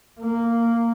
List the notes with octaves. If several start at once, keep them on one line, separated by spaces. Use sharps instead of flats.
A#3